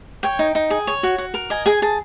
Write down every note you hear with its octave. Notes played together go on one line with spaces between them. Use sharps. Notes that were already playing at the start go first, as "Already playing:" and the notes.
C#5 G5
D#4
D#4
G#4
C#5
F#4
F#4
A#4
D#5 G#5
G#4 G#5
G#4 A5